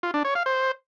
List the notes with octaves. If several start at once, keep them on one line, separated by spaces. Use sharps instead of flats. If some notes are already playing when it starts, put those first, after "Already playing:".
F4
D4
C#5
F5
C5